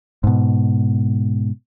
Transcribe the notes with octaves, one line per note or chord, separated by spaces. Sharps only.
G#2 B2